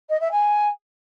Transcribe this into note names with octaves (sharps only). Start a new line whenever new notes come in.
D#5
E5
G#5